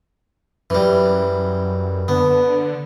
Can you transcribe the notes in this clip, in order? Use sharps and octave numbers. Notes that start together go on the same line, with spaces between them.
F#2 E3 G3
D3 B3